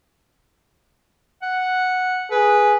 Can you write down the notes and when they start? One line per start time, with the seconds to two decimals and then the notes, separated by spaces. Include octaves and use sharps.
1.42 F#5
2.31 G#4 B4